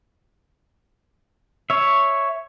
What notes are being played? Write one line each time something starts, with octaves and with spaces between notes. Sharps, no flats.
C#5 E5